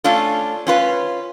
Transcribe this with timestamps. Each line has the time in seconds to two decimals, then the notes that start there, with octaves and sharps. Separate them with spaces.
0.04 A3 C#4 D4 F4 A4
0.67 C#4 F4 B4